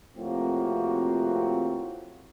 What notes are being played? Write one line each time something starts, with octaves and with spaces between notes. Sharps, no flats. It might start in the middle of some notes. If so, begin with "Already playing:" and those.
A2 C3 F3 A#3 C4 F#4